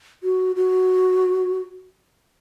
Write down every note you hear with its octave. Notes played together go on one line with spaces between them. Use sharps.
F#4
F#4